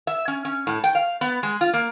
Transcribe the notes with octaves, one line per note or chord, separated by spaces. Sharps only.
E5
C#4
C#4
A2
G5
F5
B3
G#3
F4
A#3